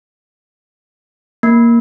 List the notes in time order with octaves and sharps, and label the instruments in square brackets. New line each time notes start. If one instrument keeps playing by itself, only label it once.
[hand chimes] A#3